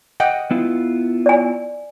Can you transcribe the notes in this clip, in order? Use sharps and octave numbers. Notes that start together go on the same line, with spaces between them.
D#5 F#5 G5
B3 E4 F4
D5 G#5